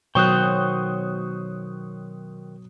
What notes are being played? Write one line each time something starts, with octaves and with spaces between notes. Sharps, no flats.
B2 D#3 F#3 C5 G5 C#6 D#6 F#6